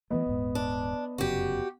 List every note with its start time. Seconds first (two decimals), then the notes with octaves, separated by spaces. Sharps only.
0.10 E3 F3 A3 B3 D#5
0.26 D#1 G#2
0.55 D4
1.18 F1 F#2 C#3 F#4 G4